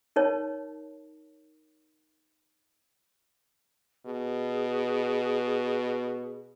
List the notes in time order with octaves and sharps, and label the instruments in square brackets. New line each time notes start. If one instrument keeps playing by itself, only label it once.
[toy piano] D#4 A#4 C#5 A5
[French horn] B2 [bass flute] G#4